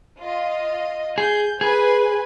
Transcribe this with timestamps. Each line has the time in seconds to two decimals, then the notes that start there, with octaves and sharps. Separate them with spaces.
0.20 F4 D#5
1.18 G#4 G6
1.61 G#4 B4 C5 G#5